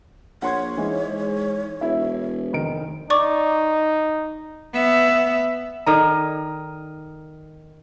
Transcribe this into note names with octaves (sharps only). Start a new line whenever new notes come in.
A#1 C#5 F#5 C6 G#6
G#2 E3 G#3
E1 E4 E5
F1 D#3 D7
D#4 D5 C#6 D6
B3 E5
D#3 A4 D5 D#5 A#5